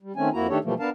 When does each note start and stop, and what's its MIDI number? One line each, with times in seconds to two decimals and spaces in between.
0.02 0.12 55
0.16 0.29 51
0.16 0.29 57
0.16 0.29 60
0.16 0.29 61
0.16 0.29 80
0.33 0.47 41
0.33 0.47 58
0.33 0.47 64
0.33 0.47 66
0.33 0.47 82
0.49 0.58 51
0.49 0.58 57
0.49 0.58 62
0.49 0.58 67
0.49 0.58 69
0.49 0.58 73
0.64 0.74 47
0.64 0.74 52
0.64 0.74 53
0.64 0.74 55
0.64 0.74 57
0.64 0.74 58
0.79 0.90 59
0.79 0.90 62
0.79 0.90 70
0.79 0.90 77
0.79 0.90 81